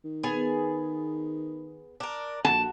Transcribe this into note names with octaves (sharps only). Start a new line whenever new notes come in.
D#3
B3 G#4 G#5
D4 A#4
A#1 F#4 A5